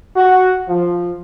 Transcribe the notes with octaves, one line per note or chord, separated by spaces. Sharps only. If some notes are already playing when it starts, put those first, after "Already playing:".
F#4
F3